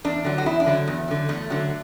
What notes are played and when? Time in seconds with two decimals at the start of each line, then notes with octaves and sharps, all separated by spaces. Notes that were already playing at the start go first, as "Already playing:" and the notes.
0.04 E2 D4
0.25 D3 F#3
0.38 F#4
0.46 E2 E4
0.60 D4
0.66 D3 F#3
0.87 E2
1.08 D3 F#3
1.29 E2 A3
1.50 D3 F#3